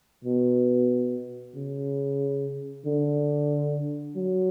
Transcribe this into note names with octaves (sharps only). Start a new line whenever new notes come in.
B2
C#3
D3
F#3